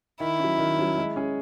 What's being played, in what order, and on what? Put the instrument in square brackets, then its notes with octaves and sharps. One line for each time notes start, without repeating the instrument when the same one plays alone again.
[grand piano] D#3 [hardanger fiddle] E4
[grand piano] F#3 C#4
D#3
F#3 C#4
G#3
C#4 G#4